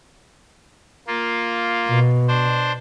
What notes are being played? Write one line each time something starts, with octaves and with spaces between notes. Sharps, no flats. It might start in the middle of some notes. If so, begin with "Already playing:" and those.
A#3 F4
B2
D4 C5